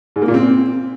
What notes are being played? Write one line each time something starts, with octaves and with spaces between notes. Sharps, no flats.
G#2
A#3
A#2
C4